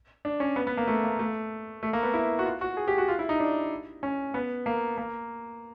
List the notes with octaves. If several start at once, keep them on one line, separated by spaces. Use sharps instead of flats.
D4
C#4
B3
B3
A#3
A3
A#3
A3
A3
A#3
B3
E4
F#4
F4
F#4
G#4
G4
F#4
F4
E4
D#4
D4
C#4
B3
A#3
A#3